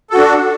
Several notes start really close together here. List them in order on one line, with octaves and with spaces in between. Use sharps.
A4 F#4 D4